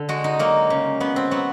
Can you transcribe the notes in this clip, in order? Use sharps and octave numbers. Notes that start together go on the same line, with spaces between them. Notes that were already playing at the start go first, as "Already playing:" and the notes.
Already playing: D3
G#3 F#4
D#4
F#3 A#3
C#3
C#3 B3
C4
F#3 B3